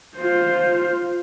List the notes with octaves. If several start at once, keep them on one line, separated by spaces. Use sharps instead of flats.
F4 C5